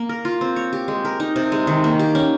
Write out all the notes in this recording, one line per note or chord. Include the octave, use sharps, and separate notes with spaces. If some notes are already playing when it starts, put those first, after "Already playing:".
Already playing: A#3
A#4
F4
C4
C#5
G4
G#3
A#4
D#4
C3
G#3
D#3
A#3
G4
C#4